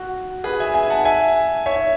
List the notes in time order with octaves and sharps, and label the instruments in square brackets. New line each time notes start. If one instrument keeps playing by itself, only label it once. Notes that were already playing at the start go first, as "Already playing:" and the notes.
Already playing: [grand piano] F#4
G#4 B4
E5 G#5
E5 G#5
F#5 A5
E5 G#5
C#5 E5